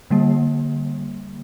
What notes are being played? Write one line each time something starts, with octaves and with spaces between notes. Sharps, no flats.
D3 G3 A#3